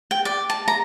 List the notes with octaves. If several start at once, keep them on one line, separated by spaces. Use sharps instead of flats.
G5
D5
A5
A#5